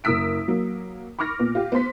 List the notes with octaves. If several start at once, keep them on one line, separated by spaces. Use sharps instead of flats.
F#1 A#4 D#6 E6 B6 D7
F#3 A#3
B5 C#6 D6 F6 A#6
A#2 B3
F4 G4
B3 C5 C6 B6